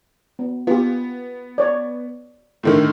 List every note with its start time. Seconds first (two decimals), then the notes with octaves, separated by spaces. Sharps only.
0.39 B3
0.67 B3 F4 G4
1.58 C#5 D5
2.63 A2 D3 D#3